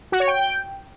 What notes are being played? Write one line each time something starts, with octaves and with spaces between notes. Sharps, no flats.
F#4
C#5
G5